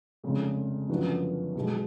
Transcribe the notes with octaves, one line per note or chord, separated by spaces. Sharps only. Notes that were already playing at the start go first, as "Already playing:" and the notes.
F1 F2 C#3 G#3
F#2 D3 F3 B3 F#4
B1 B2 G#3